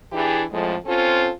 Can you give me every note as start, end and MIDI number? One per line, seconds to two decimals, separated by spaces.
0.13 0.44 52
0.13 0.44 62
0.13 0.44 64
0.13 0.44 67
0.13 0.44 68
0.51 0.75 41
0.51 0.75 45
0.51 0.75 53
0.51 0.75 56
0.86 1.30 60
0.86 1.30 61
0.86 1.30 65
0.86 1.30 69
0.86 1.30 72